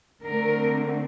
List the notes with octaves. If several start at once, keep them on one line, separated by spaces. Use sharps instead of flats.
D3 A3 C4 A#4